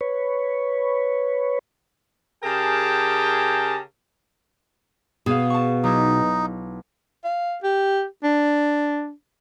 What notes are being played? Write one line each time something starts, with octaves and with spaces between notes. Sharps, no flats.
B4 C#5
C#3 G4 G#4 A#4 G5 A5
B2 G#4 F5
A5 C#6
B1 D#4 E4
F5
G4
D4